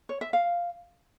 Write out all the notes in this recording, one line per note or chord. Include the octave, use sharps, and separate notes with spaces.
C#5
E5
F5